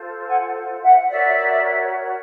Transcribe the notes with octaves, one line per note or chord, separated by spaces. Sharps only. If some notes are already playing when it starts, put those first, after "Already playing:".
Already playing: F4 A4 C5
F#5 G#5
E5 F#5
F#4 A#4 C#5 D5 E5